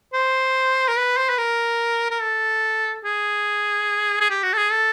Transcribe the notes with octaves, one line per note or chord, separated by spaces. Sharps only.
C5
A#4
B4
C5
B4
A#4
A#4
A4
G#4
G#4
G4
F#4
A4
G#4
A4